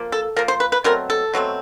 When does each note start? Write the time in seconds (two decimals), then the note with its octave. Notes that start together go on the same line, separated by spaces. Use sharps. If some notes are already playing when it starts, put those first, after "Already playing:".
Already playing: F3 A#3
0.12 A4
0.36 F3 A#3 A#4
0.48 C5
0.60 B4
0.72 B4
0.84 B2 F#3 A3 C4 A#4
1.10 A4
1.34 B2 F#3 A3 C4